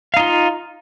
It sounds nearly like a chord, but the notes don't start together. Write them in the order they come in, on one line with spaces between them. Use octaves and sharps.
F5 D#4 F4